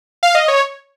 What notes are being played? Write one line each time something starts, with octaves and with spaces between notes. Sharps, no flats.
F5
D#5
C#5